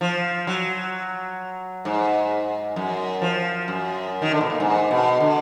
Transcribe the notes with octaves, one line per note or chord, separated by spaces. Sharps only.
F3
F#3
G#2
F#2
F3
F#2
D#3
D3
B2
A#2
G#2
B2
D3